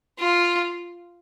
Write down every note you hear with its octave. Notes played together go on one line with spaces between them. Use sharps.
F4